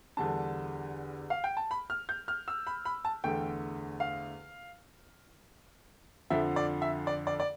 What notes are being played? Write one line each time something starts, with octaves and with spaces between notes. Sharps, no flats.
E2 D3 G3 D4 A5
F5
G5
A5
B5
F6
G6
F6
E6
B5
B5
A5
E2 D3 A3 G5
F5
F2 D3 F3 E5
D5
E5
D5
D5
D5